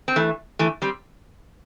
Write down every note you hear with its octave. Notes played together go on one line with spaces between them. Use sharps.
C4
E3 A3
E3 A3
G3 C4